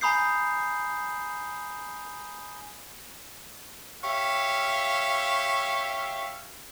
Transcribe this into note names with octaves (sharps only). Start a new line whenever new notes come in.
G#5 A#5 B5 D#6 G6 C7
G4 C#5 E5 F5